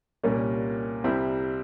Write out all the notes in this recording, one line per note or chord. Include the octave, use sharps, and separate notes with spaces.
C2 A#2 G3 A#3 C#4
C2 C3 G3 C4 E4